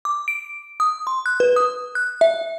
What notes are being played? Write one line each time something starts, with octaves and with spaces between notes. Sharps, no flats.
D6
D7
D#6
C6
F#6
B4
D#6
F#6
E5